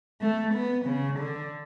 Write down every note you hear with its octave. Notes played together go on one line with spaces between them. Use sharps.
A3
B3
C#3
D3